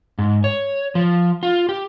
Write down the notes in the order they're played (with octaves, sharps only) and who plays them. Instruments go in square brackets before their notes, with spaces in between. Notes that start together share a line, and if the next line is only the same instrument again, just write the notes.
[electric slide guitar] G#2
C#5
F3
F4
G4